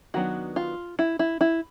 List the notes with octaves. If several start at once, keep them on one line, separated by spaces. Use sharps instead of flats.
D#3 F#3 B3 D4 F#4
F4
E4
E4
E4